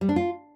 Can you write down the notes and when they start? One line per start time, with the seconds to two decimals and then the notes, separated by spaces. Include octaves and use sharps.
0.01 G3
0.09 D4
0.16 F4